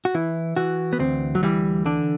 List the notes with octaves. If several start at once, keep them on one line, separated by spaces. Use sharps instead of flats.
F#4
E3 E4
E3 F#4
B3
D2 C4
F#3
E3 G3
D3 D4